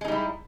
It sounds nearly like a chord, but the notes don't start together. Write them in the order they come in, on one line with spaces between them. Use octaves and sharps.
G#3 D#4 G3 E4